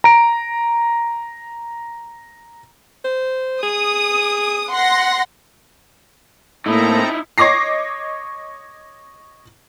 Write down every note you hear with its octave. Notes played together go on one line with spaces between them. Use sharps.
A#5 D7
C5
G#4 D#6
F#5 C6 A#6
A2 A#3 C4 D#4 E4 A4 A#5
C#5 D#5 D6 A#6 C7